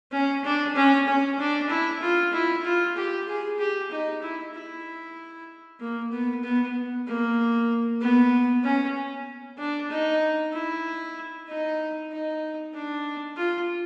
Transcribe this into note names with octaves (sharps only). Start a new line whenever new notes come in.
C#4
D4
C#4
C#4
D4
E4
F4
E4
F4
G4
G#4
G4
D#4
E4
E4
A#3
B3
B3
A#3
B3
C#4
D4
D#4
E4
D#4
D#4
D4
F4